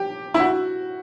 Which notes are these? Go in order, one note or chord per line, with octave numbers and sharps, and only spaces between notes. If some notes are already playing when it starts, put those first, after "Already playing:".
Already playing: G4
E4
F#4